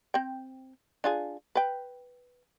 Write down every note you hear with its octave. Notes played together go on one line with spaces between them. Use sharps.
C4 G5
D4 F4 G#4
B4 G5